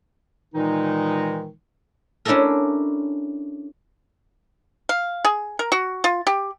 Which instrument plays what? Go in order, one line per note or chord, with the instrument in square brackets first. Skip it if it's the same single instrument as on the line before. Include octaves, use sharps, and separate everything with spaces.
[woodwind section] A#2 D#3 E3 G#3 D#4
[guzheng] C#4 D4 E4 G4 A4 A#4
[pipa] F5
G#4
A#4
F#4
F4
G4